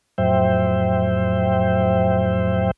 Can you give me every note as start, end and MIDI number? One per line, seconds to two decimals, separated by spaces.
0.18 2.71 41
0.18 2.71 45
0.18 2.71 54
0.18 2.71 72
0.18 2.71 76
0.18 2.71 79